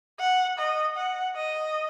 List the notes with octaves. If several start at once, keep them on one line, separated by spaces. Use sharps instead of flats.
F#5
D#5
F#5
D#5